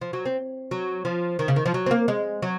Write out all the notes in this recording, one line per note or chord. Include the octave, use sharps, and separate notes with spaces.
F3
F#3
C4
F#3
F3
D#3
C#3
D#3
F3
F#3
C4
A#3
G#3
F#3